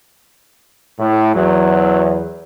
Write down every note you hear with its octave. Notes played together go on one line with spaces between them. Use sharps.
A2
E2 F#3